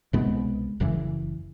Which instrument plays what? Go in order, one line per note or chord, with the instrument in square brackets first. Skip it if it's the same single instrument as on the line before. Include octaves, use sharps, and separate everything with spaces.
[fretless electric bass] C2 B2 G#3 B3
F#1 F#2 C#3 E3